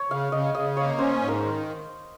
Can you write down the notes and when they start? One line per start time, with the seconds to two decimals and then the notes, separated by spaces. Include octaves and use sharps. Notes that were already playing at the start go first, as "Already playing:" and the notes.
Already playing: C#5
0.10 C#3 F5
0.32 C#3 D#5
0.55 C#3 D#5
0.77 A#3 C#5
0.99 C#4 C5
1.21 G#2
1.28 A#4
1.43 D#3